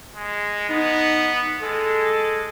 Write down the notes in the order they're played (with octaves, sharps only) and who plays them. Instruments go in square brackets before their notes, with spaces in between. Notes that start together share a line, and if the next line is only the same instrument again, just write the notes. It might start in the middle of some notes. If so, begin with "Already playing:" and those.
[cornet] G#3
[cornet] B3 [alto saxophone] D#4
[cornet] G#3 [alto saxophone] A4